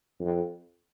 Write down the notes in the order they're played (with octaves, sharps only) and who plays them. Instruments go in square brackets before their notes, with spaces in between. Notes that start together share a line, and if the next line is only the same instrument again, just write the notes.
[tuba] F2